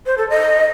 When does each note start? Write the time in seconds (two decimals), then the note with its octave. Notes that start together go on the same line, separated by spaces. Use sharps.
0.06 C5
0.18 A4
0.29 D#5